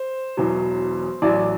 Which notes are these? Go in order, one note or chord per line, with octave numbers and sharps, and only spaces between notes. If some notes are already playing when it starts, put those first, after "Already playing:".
Already playing: C5
E1 E2 B2 F#3
A1 A2 F#3 D5